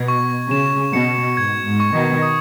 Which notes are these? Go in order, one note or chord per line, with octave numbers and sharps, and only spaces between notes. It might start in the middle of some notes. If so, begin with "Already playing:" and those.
Already playing: B2 G#6
C#6
C#3 E7
B2 C#7
G#2 G#6
G#2
C#6
B2 D#3
D#6